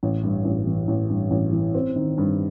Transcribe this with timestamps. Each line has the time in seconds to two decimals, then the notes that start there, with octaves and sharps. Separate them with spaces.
0.03 A1
0.23 G2
0.45 A1
0.67 E3
0.88 A1
1.09 G2
1.31 A1
1.53 E3
1.74 C4
1.96 D#3
2.18 G2